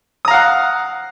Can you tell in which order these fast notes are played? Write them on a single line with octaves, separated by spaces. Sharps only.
D#6 A#5 F5 F#5